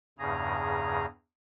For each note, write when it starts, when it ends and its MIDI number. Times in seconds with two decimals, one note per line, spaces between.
0.19 1.06 40
0.19 1.06 43
0.19 1.06 49
0.19 1.06 68
0.19 1.06 82